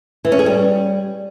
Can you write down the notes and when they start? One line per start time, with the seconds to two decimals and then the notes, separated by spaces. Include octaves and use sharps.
0.25 E3
0.32 C#4
0.39 G#4
0.46 G3